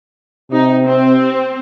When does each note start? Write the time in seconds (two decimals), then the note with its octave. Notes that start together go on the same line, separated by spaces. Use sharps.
0.51 C3 D#4
0.85 C4